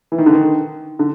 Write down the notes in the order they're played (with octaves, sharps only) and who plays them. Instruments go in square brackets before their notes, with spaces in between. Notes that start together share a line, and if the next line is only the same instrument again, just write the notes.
[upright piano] E3
D#3
D3
D#3
D3